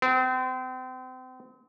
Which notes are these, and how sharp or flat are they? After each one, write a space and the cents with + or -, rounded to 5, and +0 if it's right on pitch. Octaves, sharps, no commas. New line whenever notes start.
C4 -35